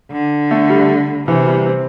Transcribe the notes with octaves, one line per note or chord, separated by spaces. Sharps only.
D3
A3
G3
C3 E3
G3
C4